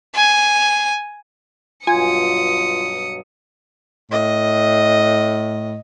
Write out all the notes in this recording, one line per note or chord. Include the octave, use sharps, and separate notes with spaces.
G#5
G2 B2 F#3 F4 G#5 D#6 C#7
A2 D#5